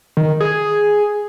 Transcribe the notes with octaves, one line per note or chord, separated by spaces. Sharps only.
D#3
G#4